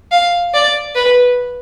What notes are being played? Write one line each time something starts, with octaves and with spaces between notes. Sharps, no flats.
F5
D5
B4